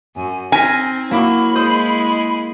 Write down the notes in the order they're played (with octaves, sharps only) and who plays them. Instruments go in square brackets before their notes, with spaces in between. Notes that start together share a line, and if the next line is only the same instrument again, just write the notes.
[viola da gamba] F#2 [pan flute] G#5
[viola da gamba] C4 [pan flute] D#4 [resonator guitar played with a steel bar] G#5 [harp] F6 A#6 B6
[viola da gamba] F#3 [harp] A#3 E4 D6 [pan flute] B5
[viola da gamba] G#3 E4 G#4 [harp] C5 D#6